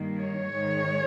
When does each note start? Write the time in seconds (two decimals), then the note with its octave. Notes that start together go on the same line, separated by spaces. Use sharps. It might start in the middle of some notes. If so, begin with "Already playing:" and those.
Already playing: G2 D#3 A#3
0.18 C#5
0.52 G#2 D#3 G#3